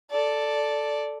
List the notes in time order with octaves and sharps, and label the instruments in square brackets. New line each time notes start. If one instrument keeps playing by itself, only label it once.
[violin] A4 D5